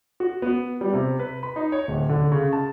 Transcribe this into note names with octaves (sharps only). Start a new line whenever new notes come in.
F#4
B3
G3
C3
B4
B5
D#4
C#5
D1
D3
C#3
A5